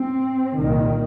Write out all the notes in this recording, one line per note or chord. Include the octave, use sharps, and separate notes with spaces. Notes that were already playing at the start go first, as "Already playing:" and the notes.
Already playing: C4
C2 A#2 D#3